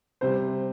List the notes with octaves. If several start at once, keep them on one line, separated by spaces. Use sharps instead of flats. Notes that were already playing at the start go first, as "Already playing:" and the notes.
C3 G3 C5